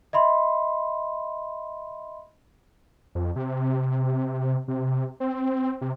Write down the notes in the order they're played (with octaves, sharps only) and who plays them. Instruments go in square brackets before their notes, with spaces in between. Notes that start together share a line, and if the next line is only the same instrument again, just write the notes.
[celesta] D#5 E5 B5 C6
[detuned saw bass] F2
C3
C3
C4
C3